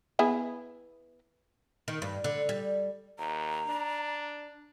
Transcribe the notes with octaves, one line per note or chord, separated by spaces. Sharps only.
B3 E4 G#4
D#3
G2
D3
G3
D#2 A#5
D4